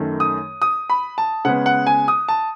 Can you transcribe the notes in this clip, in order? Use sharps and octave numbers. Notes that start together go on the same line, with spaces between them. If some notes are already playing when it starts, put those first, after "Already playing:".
Already playing: F#2 D#3 A3
D#6
D#6
B5
A5
C#3 G#3 B3 F#5
F#5
G#5
D#6
A5